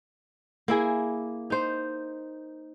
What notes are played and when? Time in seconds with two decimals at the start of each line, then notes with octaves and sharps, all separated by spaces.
0.68 A#3 E4 G#4
1.50 D#4 C5